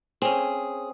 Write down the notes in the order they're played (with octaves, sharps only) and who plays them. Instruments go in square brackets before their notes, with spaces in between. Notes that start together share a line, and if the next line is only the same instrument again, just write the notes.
[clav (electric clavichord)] C4 C#4 [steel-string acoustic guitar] G#4